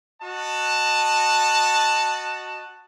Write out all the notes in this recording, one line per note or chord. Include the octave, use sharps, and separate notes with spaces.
F#4 D#5 A5